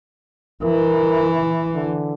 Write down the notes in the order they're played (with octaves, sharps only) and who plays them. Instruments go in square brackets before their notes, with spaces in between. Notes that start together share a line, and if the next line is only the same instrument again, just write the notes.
[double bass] E3 [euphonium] A#4
[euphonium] D3